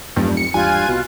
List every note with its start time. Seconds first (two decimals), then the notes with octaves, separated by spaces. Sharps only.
0.16 F1 E2 G2 F#3 A3
0.37 C#7
0.54 G#1 E2 G2 F4 G#5 F#6
0.88 C2 B2